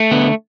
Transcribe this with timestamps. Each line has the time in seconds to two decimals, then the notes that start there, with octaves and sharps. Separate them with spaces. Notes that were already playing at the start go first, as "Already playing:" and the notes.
Already playing: A3
0.11 D3 B3